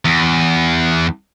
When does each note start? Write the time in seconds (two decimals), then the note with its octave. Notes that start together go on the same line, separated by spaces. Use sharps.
0.05 E2